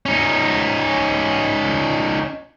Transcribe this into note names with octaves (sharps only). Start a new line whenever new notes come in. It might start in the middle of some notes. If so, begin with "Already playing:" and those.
C#4 D#4